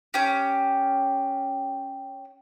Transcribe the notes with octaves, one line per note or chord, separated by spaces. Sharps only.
C#4 G4